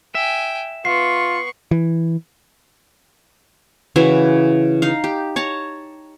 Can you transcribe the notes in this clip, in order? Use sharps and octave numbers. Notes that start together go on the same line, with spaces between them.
E5 G5 G#5
B3 F4 C#6 C7
E3
C#3 E3 E4 F#4
D#4 F5
G4
C#5 A5 A#5